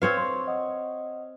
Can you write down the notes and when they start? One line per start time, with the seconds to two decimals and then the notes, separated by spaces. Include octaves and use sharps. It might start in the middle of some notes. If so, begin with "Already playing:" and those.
0.02 C4 B4 C#5 F5
0.17 C6 C#6
0.47 D#5 F#5 D#6